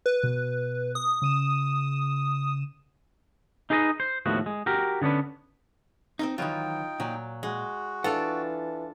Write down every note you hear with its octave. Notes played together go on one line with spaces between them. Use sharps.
B4
B2
D#6
C#3 D#7 E7
D#4 G#4 B4 D5 D#5
C5
D#2 A2 F3 B3 F#4
G#3
F#4 G4 A#4
D3 B3 C#4 D4 B4
C4 C#4 D#4
D#3 E3 F#3 D#4 F4 G5
A#2 F#3
G#3 F#4
E3 D4 F4 A4 F#5